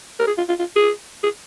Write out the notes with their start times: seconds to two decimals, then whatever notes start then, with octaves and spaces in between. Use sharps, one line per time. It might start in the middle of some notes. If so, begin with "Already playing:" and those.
0.19 A#4
0.27 G#4
0.38 F4
0.49 F4
0.59 F4
0.76 G#4
1.23 G#4